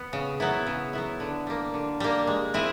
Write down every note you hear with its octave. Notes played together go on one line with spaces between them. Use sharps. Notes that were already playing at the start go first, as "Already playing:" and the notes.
Already playing: B3
C#3
F#3 B3 E4
C#3
F#3 B3 E4
D3
G3 A#3
D3
G3 A#3
G#3
C4 E4 G#4